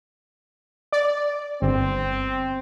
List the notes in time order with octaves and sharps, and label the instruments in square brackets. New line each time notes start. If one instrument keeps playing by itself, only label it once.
[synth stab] D5
[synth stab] G1 [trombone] C4